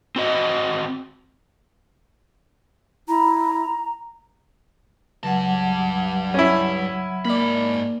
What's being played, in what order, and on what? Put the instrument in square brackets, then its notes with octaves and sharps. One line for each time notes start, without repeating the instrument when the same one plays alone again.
[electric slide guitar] C4 F#4 D#5
[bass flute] E4 [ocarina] A#5
[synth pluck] C#2 [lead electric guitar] G2 A5 [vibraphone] F#3 F#5
[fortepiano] C#4 E4
[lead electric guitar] G#2 B5 [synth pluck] A#3 D5